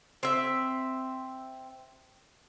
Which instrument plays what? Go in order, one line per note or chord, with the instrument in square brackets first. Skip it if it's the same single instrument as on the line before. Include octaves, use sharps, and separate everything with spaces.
[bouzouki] C4 E5